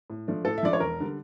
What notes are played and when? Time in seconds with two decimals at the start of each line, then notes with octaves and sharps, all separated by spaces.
0.10 A2
0.28 F3 A3 D4
0.45 A2 A4
0.58 E5
0.63 F3 A3 D4 D5
0.73 C#5
0.80 E1 A#4
1.00 D3 G3